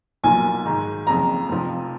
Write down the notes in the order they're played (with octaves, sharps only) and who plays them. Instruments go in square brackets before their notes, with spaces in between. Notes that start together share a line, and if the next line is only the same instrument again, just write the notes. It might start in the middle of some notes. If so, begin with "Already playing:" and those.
[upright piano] B1 A#2 F3 A#3 F4 [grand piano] G#5
[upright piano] G#2 D#3 G#3
[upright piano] F#1 F2 C#3 F3 [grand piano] A#5
[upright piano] F1 F2 F3